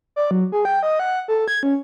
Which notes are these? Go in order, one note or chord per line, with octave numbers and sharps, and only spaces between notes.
D5
F#3
G#4
G5
D#5
F#5
A4
G#6
C#4